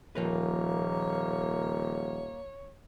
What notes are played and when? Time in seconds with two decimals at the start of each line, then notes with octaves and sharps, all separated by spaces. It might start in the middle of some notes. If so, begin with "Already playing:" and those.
0.15 D#1 F3 A#3 A#4 B4 C#5